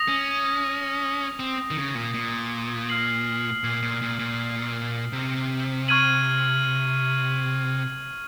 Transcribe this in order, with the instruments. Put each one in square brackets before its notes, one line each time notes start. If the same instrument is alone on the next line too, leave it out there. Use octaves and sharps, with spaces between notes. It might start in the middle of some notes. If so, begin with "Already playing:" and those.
Already playing: [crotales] D#6 A#6 F7
[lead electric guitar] C#4
C4
D#3
C#3
A#2
A#2
[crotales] F6 C7 F#7
[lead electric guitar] A#2
A#2
A#2
A#2
C3
[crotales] C#6 F6 G#6 D#7 F#7